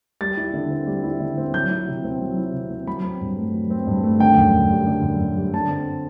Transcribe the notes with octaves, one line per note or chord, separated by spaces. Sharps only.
G3 A6
E4
D3
C4
G3
E4
D3
C4
F#3 G6
E4
C3
C4
F#3
E4
C3
C4
F#3 B5
C4
G2
A3
F#3
C4
G2
A3
D3 G5
F#2
F#2
G3
D3
F#2
F#2
G3
D3 A5
C4